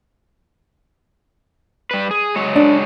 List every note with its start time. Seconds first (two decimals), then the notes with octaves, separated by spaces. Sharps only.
1.91 G3 B4
2.11 G#4
2.36 F#3 G#3 C#5
2.56 D4